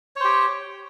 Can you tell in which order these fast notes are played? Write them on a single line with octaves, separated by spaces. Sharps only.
C#5 C5 G4